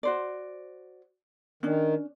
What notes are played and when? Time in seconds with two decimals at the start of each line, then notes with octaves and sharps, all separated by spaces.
0.03 F#4 C5 D5
1.63 D#3 C#4 D4